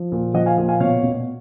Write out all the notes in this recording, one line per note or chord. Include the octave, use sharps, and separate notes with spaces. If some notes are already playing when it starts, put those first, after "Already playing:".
Already playing: F3
A#2
F3 D#5 F#5
F5 G#5
A#2
F5 G#5
B2 C#5 F5
B2